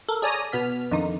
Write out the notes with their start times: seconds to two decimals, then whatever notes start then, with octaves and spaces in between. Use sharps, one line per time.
0.09 A4 A#4
0.22 G#4 C#5 D5 G#5 A#5 D#6
0.52 B2 B3 F6 B6
0.91 F2 D3 D#3 D#4